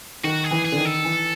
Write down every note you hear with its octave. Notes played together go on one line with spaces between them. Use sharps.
D#3 F#4
G#4
E3
G#4
D3
D#3
A4
E3